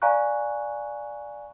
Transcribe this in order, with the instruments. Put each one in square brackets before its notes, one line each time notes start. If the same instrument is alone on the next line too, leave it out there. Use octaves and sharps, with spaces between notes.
[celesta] D5 F5 G#5 A#5 C#6 F#6